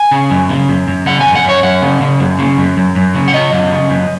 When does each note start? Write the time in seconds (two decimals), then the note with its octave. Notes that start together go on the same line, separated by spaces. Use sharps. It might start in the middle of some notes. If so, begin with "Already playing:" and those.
Already playing: G#5
0.11 C#3
0.31 F#2
0.49 C#3
0.69 F#2
0.88 F#2
1.06 C#3 F#5
1.20 G#5
1.26 F#2
1.35 F#5
1.44 F#2 C#5
1.63 F#2 F#5
1.82 C#3
2.01 C#3
2.20 F#2
2.39 C#3
2.58 F#2
2.77 F#2
2.96 F#2
3.14 C#3
3.28 F#5
3.33 C#3 D#5
3.52 F#2
3.71 C#3
3.90 F#2